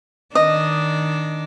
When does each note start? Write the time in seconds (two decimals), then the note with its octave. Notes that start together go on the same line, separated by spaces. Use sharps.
0.35 D#3 D4 D#5